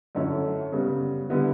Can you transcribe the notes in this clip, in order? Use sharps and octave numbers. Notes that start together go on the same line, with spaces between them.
F#2 D3 A3 C#4 E4
C#3 G3 B3
D3 G3 B3 E4